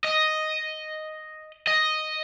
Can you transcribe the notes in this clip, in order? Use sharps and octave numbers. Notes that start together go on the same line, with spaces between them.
D#5
D#5